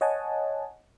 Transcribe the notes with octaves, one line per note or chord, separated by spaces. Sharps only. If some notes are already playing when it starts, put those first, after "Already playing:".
C#5 D#5 F#5 G#5 A5